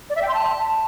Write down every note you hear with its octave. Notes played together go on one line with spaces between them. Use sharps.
D5
E5
G5
C6
A5